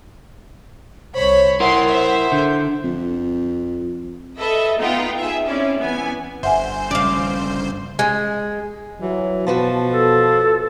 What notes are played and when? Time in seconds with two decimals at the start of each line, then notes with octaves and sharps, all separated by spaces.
1.14 C2 C5 C#5 B5
1.60 E4 A#4 F#5 C6
1.91 C5 E5
2.32 D3 G6
2.84 F2
4.39 A4 B4 D#5 E5
4.78 B3 D#4 F4 F#5 G5
5.16 G#4 E5
5.46 C4 C#4 E4 D5
5.79 E3 B3 G#5
6.43 G1 C5 E5 F#5 G#5
6.91 G2 C#3 D5 F5
7.99 G#3
9.00 E3 F#3
9.47 B2 F3 F#4 B4 A5
9.92 A4